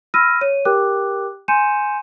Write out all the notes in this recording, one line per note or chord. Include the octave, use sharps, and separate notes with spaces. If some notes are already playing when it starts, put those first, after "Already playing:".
B5 E6 F6 A#6 D#7
C#5 D#7
G4 A#4 G5 D6 F#6
G#5 C6 G6 C#7 D#7 E7